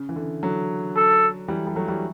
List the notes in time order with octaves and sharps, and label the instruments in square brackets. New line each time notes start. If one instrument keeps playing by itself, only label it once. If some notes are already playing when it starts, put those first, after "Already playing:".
Already playing: [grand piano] C#3
E3
D3
D3 F#3
[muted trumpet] A4
[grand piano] E3 G3
G3
F#3 A3
E3 G3